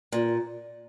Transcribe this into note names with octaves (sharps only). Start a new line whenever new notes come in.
A#2